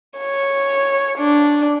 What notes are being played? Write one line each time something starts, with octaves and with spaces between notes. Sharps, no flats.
C#5
D4